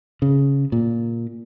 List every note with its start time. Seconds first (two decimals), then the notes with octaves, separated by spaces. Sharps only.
0.22 C#3
0.72 A#2